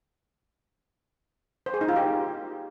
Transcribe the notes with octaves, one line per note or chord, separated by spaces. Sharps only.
C5
G#4
D#4
F4
G4